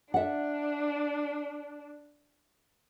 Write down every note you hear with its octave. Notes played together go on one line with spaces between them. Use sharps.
D4 E5 F#5